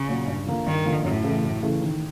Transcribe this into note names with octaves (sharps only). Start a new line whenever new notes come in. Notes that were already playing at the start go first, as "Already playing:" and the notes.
Already playing: C#3
A#2 F#3
G2
D3 F3 A#3
G2 D#3
D3 F3 A#3
F#2 A2
C#3 E3 A3
F#2
C#3 E3 A3
D#3